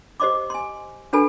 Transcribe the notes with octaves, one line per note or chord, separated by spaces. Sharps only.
G4 C5 D#5 C6 D6
G#5 C6
D4 F#4 A4 B4 G#5 B5